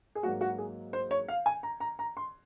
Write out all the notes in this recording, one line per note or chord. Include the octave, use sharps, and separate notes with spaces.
G#4
G#2 F#3 A#3 F#4
F#4
G#4
C5
C#5
F5
G#5
A#5
A#5
A#5
C6